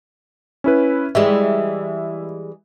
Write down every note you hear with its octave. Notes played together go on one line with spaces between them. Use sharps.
C#4 E4 B4
E3 G3 G#3 E5